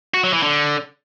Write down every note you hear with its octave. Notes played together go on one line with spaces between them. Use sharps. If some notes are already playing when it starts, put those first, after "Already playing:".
F#4
F#3
E3
D3